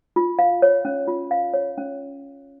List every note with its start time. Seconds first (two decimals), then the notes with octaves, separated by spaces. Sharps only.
0.16 F4
0.39 F5
0.62 C#5
0.85 C#4
1.08 F4
1.31 F5
1.54 C#5
1.77 C#4